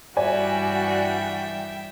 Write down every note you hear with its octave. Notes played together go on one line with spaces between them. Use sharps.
G2 E3 G3 F#4 D5 E5 G5 G#5